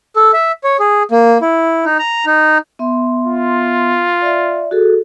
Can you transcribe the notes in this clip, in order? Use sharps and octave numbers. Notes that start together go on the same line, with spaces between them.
A4
E5
C#5
G#4
A#3
E4
D#4
A#5
D#4
B3 E5 C6
F4
D5 E5
F#4 G#4 A4